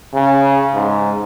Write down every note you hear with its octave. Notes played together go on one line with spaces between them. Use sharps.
C#3
G#2